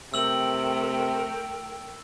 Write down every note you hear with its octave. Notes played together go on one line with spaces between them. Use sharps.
C3 A3 A#4 G5 E6 F#7